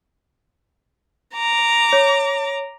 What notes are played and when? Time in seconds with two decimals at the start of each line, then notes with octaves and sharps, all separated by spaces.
1.35 A#5 D6
1.93 C#5